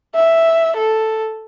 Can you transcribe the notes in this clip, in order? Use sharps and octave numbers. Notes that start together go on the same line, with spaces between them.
E5
A4